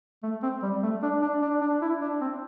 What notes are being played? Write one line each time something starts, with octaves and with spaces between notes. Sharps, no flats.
A3
C4
G3
A3
D4
D4
D4
D4
E4
D4
C4